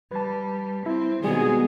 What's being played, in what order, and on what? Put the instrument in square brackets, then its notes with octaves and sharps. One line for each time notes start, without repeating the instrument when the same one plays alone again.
[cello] G3 [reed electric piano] B4 A5
[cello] C4 [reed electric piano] E4
[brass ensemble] B2 G#3 G#4 [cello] D#3 [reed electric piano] G3 [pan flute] B3